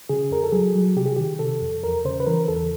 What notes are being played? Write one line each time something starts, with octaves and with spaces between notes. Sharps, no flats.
C#3 G#4
F2 A#4
A4
F#3 G#4
F#3
C3 G4
G#4
D#3 G4
C3 A4
F2
E2 A#4
C#3 C5
B4
E3 A#4
E2 A4